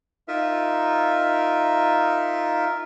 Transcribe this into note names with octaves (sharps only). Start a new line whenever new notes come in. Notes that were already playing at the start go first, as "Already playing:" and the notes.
D#4 F4 A#4 E5